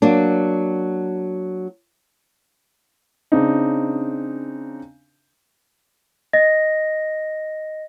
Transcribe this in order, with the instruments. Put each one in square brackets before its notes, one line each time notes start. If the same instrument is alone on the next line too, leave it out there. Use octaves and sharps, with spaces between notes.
[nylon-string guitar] F#3 A#3 D4
[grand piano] C#3 C4 D4 D#4
[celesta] D#5 A#6